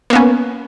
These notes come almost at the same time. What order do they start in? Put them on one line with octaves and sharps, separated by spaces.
A#3 B3 C#4